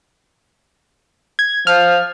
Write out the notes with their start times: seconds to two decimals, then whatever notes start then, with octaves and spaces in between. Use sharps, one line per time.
1.39 G#6
1.67 F3 F6